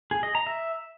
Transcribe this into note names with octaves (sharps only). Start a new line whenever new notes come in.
G#4
D#5
A#5
E5